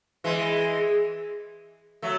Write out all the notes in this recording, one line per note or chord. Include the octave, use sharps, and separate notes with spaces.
E3 G#3
F#3 A3